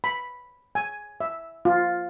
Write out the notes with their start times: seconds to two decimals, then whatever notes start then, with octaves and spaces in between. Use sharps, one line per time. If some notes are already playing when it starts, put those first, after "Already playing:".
0.04 B5
0.75 G#5
1.21 E5
1.65 F4